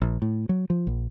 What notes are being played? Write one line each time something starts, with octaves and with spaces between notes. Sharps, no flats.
A#1
A2
F#3
F3
A#1